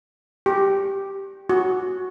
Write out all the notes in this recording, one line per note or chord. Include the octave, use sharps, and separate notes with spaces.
G4
F#4